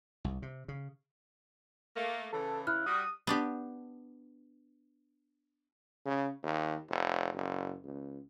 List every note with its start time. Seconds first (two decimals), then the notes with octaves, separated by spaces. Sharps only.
0.24 C2
0.42 C3
0.68 C#3
1.96 A3 A#3
2.33 C#3 E3 A4
2.67 E4 F6 F#6
2.86 G3 F#4 D#6
3.27 B3 D4 G4
6.06 C#3
6.43 D#2
6.90 F1
7.34 F#1
7.84 C#2